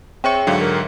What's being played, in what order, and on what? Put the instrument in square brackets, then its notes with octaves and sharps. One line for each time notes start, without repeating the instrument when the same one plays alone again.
[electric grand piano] C4 C#6 [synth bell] G#4 C#5 E5 [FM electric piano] G5 C#7
[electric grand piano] G#2 D3 F#3 [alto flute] F5
[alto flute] A#4